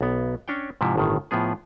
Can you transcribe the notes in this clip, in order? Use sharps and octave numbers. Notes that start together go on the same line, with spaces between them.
B1 B3
C#4 D4 C#5 G5
G#2 C3 F3 E4
G1 A2 D#3
A2 F3 B3 G#4